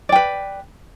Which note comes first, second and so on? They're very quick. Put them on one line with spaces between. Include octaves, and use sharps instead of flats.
D5 G5 B4